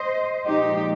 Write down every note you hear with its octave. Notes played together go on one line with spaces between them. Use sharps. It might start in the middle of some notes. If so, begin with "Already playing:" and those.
Already playing: C5 D#5
A#2 F3 G#3 D#4 G4